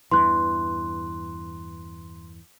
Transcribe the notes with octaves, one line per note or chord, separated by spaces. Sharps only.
E2 G2 E3 C6 F#6